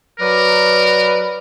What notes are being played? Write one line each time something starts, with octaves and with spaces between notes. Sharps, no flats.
F#3 A#4 B4 D5